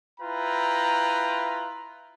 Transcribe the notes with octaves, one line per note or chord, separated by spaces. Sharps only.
E4 F4 B4 G5 A#5